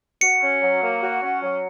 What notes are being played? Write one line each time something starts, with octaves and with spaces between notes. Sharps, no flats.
F#4 C#7
C#4
F#3
A#3
F#4
C#4
F#3